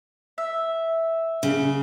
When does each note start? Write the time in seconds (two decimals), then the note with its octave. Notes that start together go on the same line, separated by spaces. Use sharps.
0.38 E5
1.43 C#3